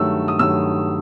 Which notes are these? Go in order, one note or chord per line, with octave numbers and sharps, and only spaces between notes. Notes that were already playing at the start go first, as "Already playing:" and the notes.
Already playing: G2 D#3 F#3 A3 E6
D#6
G2 D#3 F#3 A3 E6